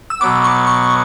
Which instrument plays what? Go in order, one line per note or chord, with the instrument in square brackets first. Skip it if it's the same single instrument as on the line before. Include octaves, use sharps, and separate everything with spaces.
[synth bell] E6
[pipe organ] B2 F#3 B3 [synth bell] D6
[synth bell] C#6
C#6